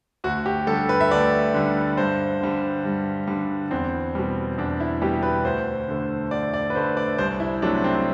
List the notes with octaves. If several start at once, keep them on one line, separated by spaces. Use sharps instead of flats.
D2 F#4
G4
D3 G3 A4
B4
E5
D2 D5
D3 G3
G2 C5
D3 G3
G2
D3 G3
E2 C4
B2 G3
E2 D4
E4
B2 G3 G4
B4
D2 C5
D3 A3
D2 D5
D5
B4
D3 A3 C5
D5
C2 C5
E4
C3 F#3 A3 D4
C4